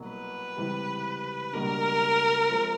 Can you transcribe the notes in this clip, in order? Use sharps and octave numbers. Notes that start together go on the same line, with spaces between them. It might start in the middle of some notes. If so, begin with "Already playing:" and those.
Already playing: C2 B2 F#3 A#3
B4
C#2 C3 E3 G3
C#2 B2 G3 A#3 D4 A#4
F3 G#3 C4